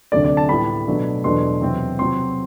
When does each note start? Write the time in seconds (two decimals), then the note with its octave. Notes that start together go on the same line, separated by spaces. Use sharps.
0.12 D2 C3 F#3 A3 D4 D5
0.24 D5
0.37 A5
0.49 A2 G3 B3 B5
0.87 B2 F#3 A3 D4
1.24 E2 B2 F#3 A3 D4 C6
1.61 E2 C3 F#3 C4
1.99 C3 F#3 C4 C6